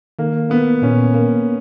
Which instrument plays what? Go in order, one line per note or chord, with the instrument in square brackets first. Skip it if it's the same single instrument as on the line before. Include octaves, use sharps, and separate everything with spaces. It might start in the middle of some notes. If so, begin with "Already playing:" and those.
[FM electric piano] D#3 [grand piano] A#3
[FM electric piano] A#3 [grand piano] B3
[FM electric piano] A#2 [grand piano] C#4
[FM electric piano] A#3